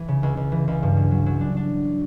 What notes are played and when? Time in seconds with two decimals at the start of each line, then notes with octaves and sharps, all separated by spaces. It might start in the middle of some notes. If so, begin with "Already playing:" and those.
Already playing: E3
0.08 C#3
0.23 C#2
0.37 C#2
0.52 E3
0.68 C#2
0.83 G2
0.97 F#3
1.11 F#3
1.26 F#3
1.41 D4
1.57 D4